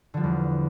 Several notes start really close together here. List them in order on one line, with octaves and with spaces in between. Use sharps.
D3 F3 G3 E2